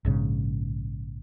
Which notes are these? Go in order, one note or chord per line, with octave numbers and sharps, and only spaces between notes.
A#1 G#2 C#3